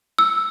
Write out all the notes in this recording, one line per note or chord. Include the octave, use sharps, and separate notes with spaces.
E6